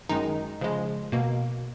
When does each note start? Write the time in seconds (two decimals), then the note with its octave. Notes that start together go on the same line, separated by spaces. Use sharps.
0.09 F#2 D#3 G#3 D#4
0.61 C#3 F3 G#3
1.12 B2 A#3